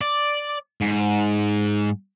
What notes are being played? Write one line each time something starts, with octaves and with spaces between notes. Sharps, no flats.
D5
G#2